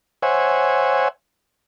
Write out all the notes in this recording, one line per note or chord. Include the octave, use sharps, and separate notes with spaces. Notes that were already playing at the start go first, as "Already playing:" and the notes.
C5 C#5 E5 F#5 G#5